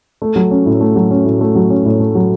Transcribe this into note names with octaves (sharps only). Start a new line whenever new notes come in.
A3
F#3
C#4
A2
A3
F#3
C#4
A2
A3
F#3
C#4
A2
A3
F#3